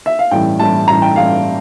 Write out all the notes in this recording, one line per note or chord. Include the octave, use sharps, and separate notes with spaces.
E5
F5
A1 G2 E3 G5
A1 G2 E3 A5
A1 G2 E3 A#5
G5
A1 G2 E3 F5